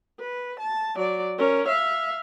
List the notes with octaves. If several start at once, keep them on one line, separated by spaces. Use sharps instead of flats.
B4
A5
F#3 D5
C#4 A#4
E5 F5